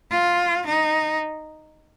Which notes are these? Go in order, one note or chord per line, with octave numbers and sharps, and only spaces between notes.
F4
D#4